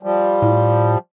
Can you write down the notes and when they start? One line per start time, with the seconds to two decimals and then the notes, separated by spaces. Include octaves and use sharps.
0.03 F3 G3
0.42 A2